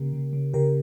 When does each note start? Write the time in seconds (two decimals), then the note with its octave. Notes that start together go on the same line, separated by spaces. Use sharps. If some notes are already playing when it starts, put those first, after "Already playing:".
Already playing: C#3 A#3 G4 A#4
0.13 C#3
0.33 C#3
0.53 C#3 G4 A#4